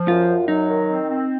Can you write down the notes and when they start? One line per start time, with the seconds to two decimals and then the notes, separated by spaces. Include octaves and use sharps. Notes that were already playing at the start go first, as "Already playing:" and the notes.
Already playing: F3
0.08 F#2 F4
0.29 F#2
0.48 F#3 D#4
0.69 D#3
0.89 C4
1.09 C4